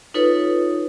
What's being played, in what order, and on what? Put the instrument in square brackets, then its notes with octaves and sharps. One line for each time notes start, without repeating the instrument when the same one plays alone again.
[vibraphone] D#4 F4 A4 B4 C#5